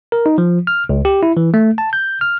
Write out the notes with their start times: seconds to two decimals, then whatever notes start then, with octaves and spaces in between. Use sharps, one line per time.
0.12 A#4
0.26 D#4
0.38 F3
0.67 F6
0.89 C#2
1.05 G4
1.23 E4
1.37 E3
1.54 A3
1.78 A5
1.93 G6
2.21 F6